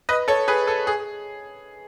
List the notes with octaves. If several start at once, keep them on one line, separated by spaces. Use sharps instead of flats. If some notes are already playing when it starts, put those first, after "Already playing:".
B4 D#5
A4 C#5
G#4 B4
A4
G#4